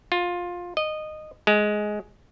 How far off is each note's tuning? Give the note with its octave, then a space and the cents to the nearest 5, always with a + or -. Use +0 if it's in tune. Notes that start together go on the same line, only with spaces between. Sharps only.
F4 +15
D#5 -15
G#3 +10